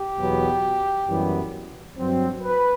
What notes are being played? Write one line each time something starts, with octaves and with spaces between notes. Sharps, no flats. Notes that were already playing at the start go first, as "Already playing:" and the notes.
Already playing: G4
E2 B2 F#3 B3
F#2 E3 G3 B3
G2 F#3 C4
B4